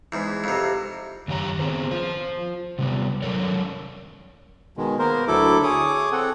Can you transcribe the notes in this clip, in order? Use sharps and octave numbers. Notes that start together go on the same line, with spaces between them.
E2 G#2
F2 C3
F#2 D#3 G4 C#5 G#5 A#5
B3 C4 G#4 C5
F4 C5
C3 G3 B3
F#3 A4 A#4 C#5 D5
B2 D#3 G#3
A#3 B3 A#4 C5
D2 F#3 E4 A4 D6
G#4 C#5 D6 D#6
C4 A4 F#5